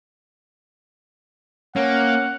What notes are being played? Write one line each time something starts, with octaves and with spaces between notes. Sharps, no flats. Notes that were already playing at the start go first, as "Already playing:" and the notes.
A#3 C#4 F#5